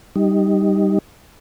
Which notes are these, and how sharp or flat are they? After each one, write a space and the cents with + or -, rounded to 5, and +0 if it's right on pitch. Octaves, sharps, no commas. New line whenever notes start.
G3 +0 D#4 +0